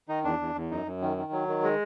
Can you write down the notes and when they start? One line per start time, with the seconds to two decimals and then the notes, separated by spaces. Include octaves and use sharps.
0.09 D#3 D#4
0.24 E2 D4
0.40 E2
0.55 E2
0.71 F#2 D#4
0.86 F#2
1.02 D#3
1.17 D#3
1.32 F#3
1.48 D#3
1.63 G#3